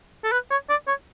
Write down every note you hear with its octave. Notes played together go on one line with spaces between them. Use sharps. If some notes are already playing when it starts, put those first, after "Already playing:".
A4
B4
C#5
D5
C#5